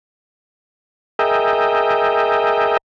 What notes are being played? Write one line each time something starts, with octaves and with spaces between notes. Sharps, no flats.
G#4 A#4 D#5 E5 G5